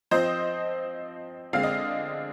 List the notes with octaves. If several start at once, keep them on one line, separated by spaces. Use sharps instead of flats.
F3 C4 C5 D#5
D3 G#3 C4 F5
D#5